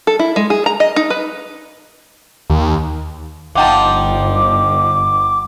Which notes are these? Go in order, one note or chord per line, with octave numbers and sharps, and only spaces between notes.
A4
E4
G#3
G#4
A#5
D#5
D#4
B4
D#2
G1 F3 D#4 F#5 G5 A5 D6